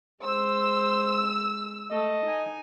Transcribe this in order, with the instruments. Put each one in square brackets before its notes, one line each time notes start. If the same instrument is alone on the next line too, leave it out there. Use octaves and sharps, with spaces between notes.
[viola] G#3 [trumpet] C5 [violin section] E6
[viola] A3 A4 [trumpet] D#5
[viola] D#4 G#5